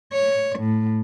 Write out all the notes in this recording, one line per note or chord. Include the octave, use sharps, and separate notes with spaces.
C#5
A2